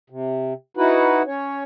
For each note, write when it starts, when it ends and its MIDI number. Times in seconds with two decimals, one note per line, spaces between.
0.10 0.53 48
0.77 1.22 63
0.77 1.22 64
0.77 1.22 66
0.77 1.22 71
0.77 1.22 78
1.26 1.64 61
1.26 1.64 73